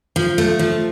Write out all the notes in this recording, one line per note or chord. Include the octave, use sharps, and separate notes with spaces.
F3
A3
F3